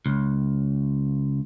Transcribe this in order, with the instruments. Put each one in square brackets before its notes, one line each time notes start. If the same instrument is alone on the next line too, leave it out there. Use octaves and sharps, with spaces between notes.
[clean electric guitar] C#2